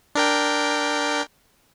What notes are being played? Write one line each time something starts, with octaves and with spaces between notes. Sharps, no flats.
D4 A#4 G5